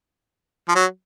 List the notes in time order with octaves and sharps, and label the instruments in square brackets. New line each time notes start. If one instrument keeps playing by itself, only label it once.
[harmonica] F3
F#3